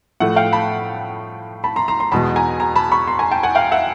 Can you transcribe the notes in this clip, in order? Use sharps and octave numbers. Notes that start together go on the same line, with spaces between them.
A2 F3 A3 E5 F#5
F5 G5
A5 B5
A5 B5
A#5 C6
A#5 C6
A#5 C6
E2 B2 G#3 A5 B5
G#5 A#5
G#5 A#5
A5 B5
B5 C#6
A#5 C6
G#5 A#5
G5 A5
F#5 G#5
F5 G5
E5 F#5